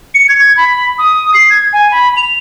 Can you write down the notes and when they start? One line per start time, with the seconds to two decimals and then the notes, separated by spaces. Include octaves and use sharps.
0.15 C#7
0.29 G#6
0.57 B5
0.98 D#6
1.34 C7
1.50 G#6
1.73 G#5
1.91 B5
2.17 F7